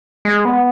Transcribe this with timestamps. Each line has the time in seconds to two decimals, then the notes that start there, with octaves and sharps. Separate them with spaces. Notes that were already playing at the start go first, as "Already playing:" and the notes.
0.25 G#3
0.45 B3